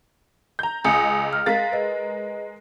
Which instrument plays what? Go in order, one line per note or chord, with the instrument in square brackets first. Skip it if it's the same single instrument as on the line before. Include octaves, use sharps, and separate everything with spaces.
[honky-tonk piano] A#5 G6
[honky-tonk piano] C#2 D#5 [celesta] G#5 D#6 C#7
[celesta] F6
[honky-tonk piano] G#3 A#4 A6 [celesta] F5 B6
[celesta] B4 D#5